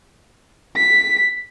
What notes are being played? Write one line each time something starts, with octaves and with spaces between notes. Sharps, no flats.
B6